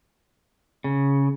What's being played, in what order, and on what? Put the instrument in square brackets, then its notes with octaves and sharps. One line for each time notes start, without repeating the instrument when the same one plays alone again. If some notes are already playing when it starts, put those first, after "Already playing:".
[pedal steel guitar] C#3